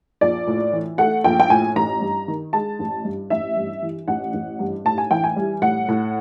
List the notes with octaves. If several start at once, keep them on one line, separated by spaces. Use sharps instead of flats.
A#1 D5
A2
E3
A3 F#5
A#1 G5
G5
A2 G#5
A1 A#5
G2
D#3
G#3 A5
A1
G2
A1 E5
G2
E3
A1 F#5
A1
G2
A2 A5
G#5
E3 G5
G#5
G3
A2 F#5
A2